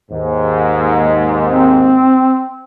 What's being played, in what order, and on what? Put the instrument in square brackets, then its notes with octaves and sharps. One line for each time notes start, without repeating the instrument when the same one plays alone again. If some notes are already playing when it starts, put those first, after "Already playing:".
[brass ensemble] D#2 G#2
[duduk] C4